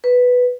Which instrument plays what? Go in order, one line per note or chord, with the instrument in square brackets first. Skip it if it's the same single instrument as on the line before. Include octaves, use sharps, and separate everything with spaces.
[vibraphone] B4